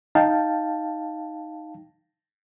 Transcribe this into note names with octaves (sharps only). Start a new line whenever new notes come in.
D#4 F5 G5 A5